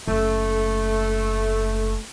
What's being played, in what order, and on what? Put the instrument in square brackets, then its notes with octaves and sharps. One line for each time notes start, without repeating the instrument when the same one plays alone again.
[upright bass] F#1 [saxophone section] A3